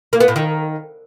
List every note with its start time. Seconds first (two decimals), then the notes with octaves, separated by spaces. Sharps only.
0.13 A#3
0.20 B3
0.28 A2
0.36 D#3